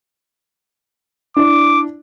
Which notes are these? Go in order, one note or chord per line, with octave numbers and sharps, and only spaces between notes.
D4 E4 D5 D6